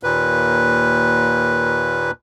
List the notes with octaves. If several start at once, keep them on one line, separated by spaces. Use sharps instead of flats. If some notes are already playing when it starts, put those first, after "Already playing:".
D#2 A#2 B4